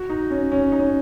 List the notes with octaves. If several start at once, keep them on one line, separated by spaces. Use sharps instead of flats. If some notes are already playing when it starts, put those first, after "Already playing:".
Already playing: F#4
D#4
C#4
C#4
D#4
C#4